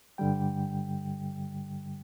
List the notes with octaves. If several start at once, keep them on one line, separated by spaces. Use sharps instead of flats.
G2 D3 G3 G5